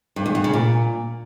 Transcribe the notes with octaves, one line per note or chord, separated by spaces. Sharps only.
G2
E2
G2
C#3
A#2